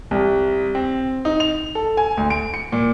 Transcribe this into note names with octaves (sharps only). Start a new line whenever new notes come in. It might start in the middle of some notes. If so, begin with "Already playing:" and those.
C2
C4
D#4
F7
A4
G#5
D2
D7
C#7
A#2